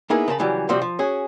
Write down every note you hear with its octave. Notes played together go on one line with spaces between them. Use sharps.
A#3 B3 D#4 E4 G#4 A#4
C#3 A#4 A5 B5
C#3 E3 F#3 G3
C3 F3 G3 C4 F#4
F3
C#4 F#4 G#4